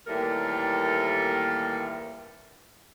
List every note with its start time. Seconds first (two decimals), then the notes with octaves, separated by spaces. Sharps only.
0.07 D#2 A2 E3 G3 A4 A#4